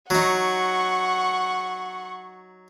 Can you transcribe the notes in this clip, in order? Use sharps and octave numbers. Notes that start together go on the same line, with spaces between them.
F#3 D#4 F#5 C#6